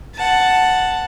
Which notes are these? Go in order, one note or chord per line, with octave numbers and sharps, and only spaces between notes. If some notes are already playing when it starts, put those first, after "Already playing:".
F#5 A5